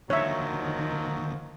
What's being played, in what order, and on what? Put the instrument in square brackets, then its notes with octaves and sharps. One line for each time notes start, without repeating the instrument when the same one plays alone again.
[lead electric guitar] D#2 D3 [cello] D#3 [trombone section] F3 F#3 [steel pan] C#5 E5